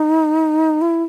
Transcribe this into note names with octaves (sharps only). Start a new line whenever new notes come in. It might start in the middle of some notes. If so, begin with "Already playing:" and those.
Already playing: D#4
E4